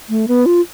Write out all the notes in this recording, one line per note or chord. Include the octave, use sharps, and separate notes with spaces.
A3
B3
F4